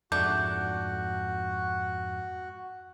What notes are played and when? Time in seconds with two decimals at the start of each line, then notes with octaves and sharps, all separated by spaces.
0.12 F2 G#2 A3 D4 F#4 G6